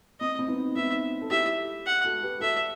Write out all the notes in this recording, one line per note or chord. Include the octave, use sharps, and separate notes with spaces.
C4 D#5
C4
B3 D#4
B3 D#4 E5
A4
E4 G4 E5
F#5
F#4 A4
G4 B4
F#4 A4 E5